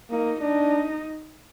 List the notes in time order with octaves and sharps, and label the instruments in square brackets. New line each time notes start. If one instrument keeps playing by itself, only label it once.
[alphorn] A#3 [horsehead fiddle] D#4
[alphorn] D4 [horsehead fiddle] D#4